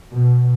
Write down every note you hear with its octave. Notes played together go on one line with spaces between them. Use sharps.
B2